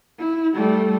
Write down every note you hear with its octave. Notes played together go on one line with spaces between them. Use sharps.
E4
G3 A3